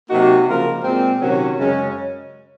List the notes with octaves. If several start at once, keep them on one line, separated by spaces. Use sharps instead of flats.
C3 F#3 A#3 D#4 F#4
C#3 F3 A#3 F4 A#4
A#2 G#3 C4
C3 D#3 F#3 C#4 F#4
F#2 C#3 G#3 C#4